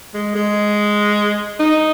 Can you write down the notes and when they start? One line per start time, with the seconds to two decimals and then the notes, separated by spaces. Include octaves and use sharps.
0.14 G#3
0.35 G#3
1.60 D#4